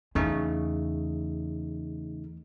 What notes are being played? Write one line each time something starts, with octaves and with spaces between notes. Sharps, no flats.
E2 C#3 A3 D#4